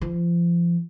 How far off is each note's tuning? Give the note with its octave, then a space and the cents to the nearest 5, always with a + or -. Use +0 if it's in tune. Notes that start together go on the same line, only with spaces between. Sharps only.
F3 -30